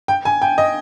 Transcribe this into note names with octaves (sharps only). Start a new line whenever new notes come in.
G5
G#5
G5
D#5